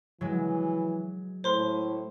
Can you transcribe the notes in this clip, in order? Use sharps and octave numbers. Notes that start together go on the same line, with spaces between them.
E3 F#3 G#3
A2 C5 C6